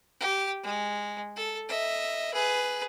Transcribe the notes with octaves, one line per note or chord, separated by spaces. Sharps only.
G4
G#3
A4
D#5 E5
G#4 B4